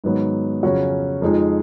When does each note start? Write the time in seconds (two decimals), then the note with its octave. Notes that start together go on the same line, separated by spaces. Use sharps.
0.04 G#2 D#3 F#3 B3
0.63 F2 C#3 F#3 C#4 F#4
1.22 F2 F3 G#3 D#4